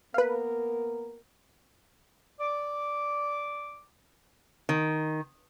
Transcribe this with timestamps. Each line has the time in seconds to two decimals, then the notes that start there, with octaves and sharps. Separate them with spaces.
0.14 A#3 B3 A#4 B4 F5
2.39 D5 D6
4.69 D#3